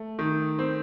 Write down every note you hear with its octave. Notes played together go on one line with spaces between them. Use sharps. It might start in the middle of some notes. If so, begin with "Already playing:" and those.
Already playing: A3
D#3
C4